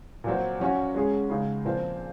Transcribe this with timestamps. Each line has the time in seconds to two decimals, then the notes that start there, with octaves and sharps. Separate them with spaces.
0.24 A#2 F#3 C4
0.60 F#3 C#4 F#4
0.94 G#3 C#4 G#4
1.29 C#3 G#3 D#4 G#4
1.65 A#2 F3 C4 F4